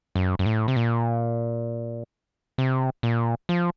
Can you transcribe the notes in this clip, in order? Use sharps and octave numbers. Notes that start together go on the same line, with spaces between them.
F#2
F#2
A2
C3
A#2
C3
A#2
F3